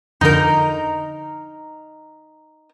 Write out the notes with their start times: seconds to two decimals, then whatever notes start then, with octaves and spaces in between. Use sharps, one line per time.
0.21 F2 D3 D#4 A#4 G6